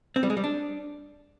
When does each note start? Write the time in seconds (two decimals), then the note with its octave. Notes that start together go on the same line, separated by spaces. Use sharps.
0.16 C4
0.23 G3
0.30 G#3
0.37 G3
0.44 D4